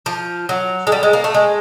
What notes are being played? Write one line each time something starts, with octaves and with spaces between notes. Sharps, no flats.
F3
F#3
G#3
G3
G#3
A#3
A3
G#3